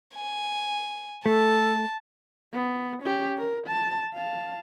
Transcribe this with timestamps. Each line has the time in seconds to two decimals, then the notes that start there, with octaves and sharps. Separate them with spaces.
0.15 G#5
1.26 A3 A4 A5
2.53 B3
3.03 C#4 G4
3.38 A#4
3.67 A5
4.14 F5 A5